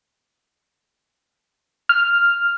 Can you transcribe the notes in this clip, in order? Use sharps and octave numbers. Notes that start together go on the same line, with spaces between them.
F6